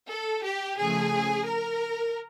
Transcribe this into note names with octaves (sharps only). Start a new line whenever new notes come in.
A4
G4
C#3 F3 A3 G#4
A#4